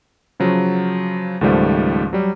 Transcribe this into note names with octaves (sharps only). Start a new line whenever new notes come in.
C#3 F3 F#3
C#2 G#2 D#3 F3 G3 A3
F#3 G3